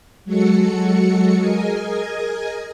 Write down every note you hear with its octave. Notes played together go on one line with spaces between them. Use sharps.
F#3 G#3 F#4 A4 C#7
G#4 A#4 D#5 G#5